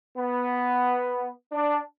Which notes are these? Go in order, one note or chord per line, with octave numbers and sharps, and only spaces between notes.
B3
D4